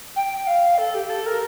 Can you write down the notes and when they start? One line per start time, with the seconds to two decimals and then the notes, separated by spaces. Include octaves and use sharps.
0.16 G5
0.47 F5
0.77 A4
0.94 G4
1.09 A4
1.26 A#4